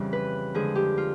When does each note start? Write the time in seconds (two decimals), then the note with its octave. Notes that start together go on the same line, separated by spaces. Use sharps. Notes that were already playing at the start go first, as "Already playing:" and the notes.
Already playing: F2 C#3 E3 G3
0.13 B4
0.54 D3 F3 G#3 G#4
0.75 G4
0.98 F4